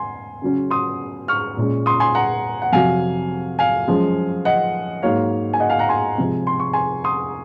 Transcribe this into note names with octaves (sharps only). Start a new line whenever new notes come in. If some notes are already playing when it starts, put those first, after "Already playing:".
Already playing: G#5 C6
C#3 F#3 C#4
C6 D#6
C#6 F6
A#2 G#3 C#4
C6 D#6
G#5 C6
F#5 A#5
F#5
F2 C3 F#3 F5 G#5
F5 G#5
F#2 F3 G#3
D#5 F#5
G#2 F#3 A#3 C#5 F5
G#5
D#5 F#5
F5 G#5
F#5 A#5
G#5 C6
C3 F3 G#3
C6
C#6
G#5 C6
C6 D#6